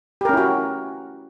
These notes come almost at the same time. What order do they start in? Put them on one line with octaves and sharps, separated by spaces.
G4 A#4 C#4 E4 F#4